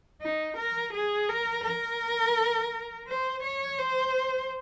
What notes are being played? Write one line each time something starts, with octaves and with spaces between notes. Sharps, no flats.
D#4
A#4
G#4
A#4
A#4
C5
C#5
C5